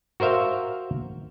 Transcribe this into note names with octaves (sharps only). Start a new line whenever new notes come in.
F#4 A#4 C5 E5 F5